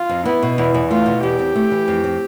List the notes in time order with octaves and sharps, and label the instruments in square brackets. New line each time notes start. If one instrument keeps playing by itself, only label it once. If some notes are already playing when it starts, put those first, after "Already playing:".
Already playing: [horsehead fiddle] F4
[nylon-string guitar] F2
[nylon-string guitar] B3 [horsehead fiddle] E4
[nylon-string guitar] B2
[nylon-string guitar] E2 [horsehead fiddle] E4
[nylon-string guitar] E2
[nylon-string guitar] A3 [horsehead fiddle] F4
[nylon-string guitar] B2
[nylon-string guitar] E2 [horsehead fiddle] G4
[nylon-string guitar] C4
A3
E3
F2
C4